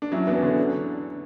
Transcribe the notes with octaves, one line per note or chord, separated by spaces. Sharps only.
D4
F#3 C#4 E4
E2 B3 D4
D3 C#4
D3